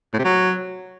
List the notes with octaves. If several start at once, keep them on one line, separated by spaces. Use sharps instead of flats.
A2
C3
F#3